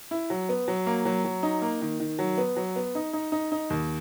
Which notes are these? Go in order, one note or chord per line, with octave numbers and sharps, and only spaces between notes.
E4
F#3
B3
F#3
A#3
F#3
F#3
D#4
A#3
D#3
D#3
F#3
B3
F#3
B3
D#4
D#4
D#4
D#4
D#2